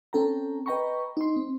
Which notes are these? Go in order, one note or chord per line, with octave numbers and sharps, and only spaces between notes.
C4 C#4 A4 G5 A#5
B4 D#5 G5 A#5 B5 C#6
D#4 C6
C4